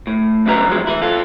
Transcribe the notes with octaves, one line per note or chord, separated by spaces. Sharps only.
A2
C2 F#2 C#3 F#3 B4 A#5
E2 F3 F#3 G#3
E3 E4
F4 A4